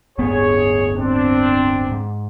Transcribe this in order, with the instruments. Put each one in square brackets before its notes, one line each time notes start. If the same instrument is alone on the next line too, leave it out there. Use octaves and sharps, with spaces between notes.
[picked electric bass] D1 G1 B3 [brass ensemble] G#4 C#5
[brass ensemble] C4 D4
[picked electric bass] G#2